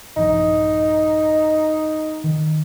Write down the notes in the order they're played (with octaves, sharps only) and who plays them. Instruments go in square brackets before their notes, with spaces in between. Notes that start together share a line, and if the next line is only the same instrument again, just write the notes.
[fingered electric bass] A#1 G2 F3 [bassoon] D#4
[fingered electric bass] D#3